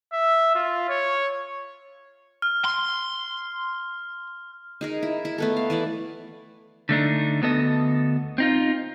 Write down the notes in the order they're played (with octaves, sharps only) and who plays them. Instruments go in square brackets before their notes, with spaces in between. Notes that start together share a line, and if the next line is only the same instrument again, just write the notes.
[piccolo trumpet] E5
F4
C#5
[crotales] F6
[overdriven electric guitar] C6
[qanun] D#4 G#4 A#4
E4
E4
A3 B3 A4
F5
E3 E4 D5
[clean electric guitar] D3 A3 D4 D#4
D2 B3 A4 D#5
C4 D#4 F4